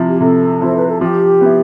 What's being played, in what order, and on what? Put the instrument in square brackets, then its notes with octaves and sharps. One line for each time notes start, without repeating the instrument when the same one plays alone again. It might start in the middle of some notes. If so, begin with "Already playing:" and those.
Already playing: [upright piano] C3 F3 C4 E4
[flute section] G4
[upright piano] C3 [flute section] A4
[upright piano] F3 C4 E4 [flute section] C5
[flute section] B4
A4
[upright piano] F3 [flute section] G4
[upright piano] B3 E4